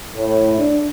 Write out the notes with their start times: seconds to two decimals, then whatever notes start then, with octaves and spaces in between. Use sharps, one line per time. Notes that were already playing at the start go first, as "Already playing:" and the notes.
0.13 A2
0.57 D4